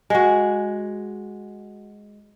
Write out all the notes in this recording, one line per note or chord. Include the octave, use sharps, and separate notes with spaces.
G#3 F#4